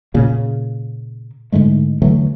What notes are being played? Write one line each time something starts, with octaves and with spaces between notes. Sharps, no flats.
A#2 C#3 A#3
G#2 D3 G#3 A3
D3 E3 F#3 A3